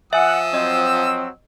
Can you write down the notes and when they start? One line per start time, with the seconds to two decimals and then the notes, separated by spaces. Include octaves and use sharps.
0.13 F3 E5 F#5 G#5 D#6 E6
0.54 F#3 C4 D#5